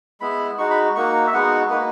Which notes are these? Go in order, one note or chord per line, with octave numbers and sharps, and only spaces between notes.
G#3 B3 E4 B5
G#3 D#4 F#4 C#6
B5
A#3 D#4 F#4 C#6
E5
G#3 B3 D#4 F#4 F#5
A#3 D#4 F#4 B4